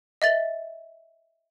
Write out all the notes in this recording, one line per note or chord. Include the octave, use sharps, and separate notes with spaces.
D#5 E5 A6